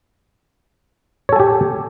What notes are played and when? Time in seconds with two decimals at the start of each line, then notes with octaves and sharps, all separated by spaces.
1.29 C#5
1.33 A4
1.36 G#5
1.40 G4